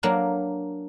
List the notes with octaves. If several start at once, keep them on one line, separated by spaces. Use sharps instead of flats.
F#3 A#3 D4